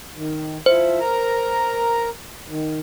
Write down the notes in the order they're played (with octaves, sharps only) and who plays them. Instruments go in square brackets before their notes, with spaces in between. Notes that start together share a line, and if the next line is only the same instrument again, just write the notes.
[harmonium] D#3
[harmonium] F3 E4 [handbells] C5
[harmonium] A#4 A#5
D#3